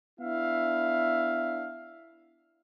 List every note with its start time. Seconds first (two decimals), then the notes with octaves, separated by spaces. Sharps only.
0.20 B3 D4 E4 E5 F5